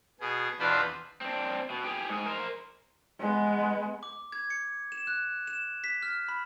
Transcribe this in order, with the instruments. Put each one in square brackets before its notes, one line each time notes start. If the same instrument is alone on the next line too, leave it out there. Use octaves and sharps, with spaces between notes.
[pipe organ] B2 G#4
E2 B2 D4 F4 B4 C5
[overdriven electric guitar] C4 D4
B2
G4 G#4
G#2 G#4
A#4 C5
[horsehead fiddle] G#3 B3
[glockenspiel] D6
G#6
C#7
E7
F#6
E7
B6
F6
B5